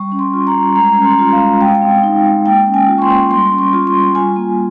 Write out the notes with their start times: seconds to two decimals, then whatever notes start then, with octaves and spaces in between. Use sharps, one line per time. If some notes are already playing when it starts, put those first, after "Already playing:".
Already playing: G3 C#6
0.12 C#4
0.19 C6
0.34 F4
0.47 A#5
0.54 G3
0.76 G#3 A#5
0.97 C#4
1.04 C6
1.19 F4
1.32 F5
1.39 G#3
1.61 G#3 G5
1.68 F5
1.75 G5
1.82 C4
2.03 D#4
2.24 G#3
2.46 A#3 G5
2.67 C#4
2.74 G#5
2.88 F4
2.98 C#6
3.02 C6
3.09 A#3
3.30 G3 C6
3.51 C#4
3.58 C#6
3.73 F4
3.87 C6
3.94 G3
4.15 F4 G#5
4.36 A#3